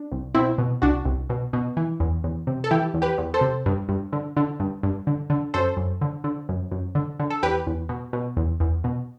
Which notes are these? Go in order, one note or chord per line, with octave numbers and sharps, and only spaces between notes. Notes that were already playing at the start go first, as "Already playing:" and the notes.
Already playing: D4
C2
B2 C4 E4
B2
C2 D4 F#4
C2
B2
B2
E3
E2
E2
C3
A4
E3 E4 G4
E2
G4 B4
E2
A4 C5
C3
G2
G2
D3
D3
G2
G2
D3
D3
F#2 A4 C5
F#2
D3
D3
F#2
F#2
D3
D3
A4
E2 G4 B4
E2
B2
B2
E2
E2
B2